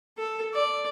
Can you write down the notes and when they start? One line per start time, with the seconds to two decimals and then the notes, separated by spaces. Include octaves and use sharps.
0.18 A4
0.54 D5